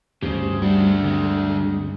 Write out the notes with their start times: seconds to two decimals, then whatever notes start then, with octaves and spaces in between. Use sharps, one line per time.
0.22 D2 G2 C#3 G4 C5
0.62 G3 D4 F#4
1.04 D3 G3 G#3 C4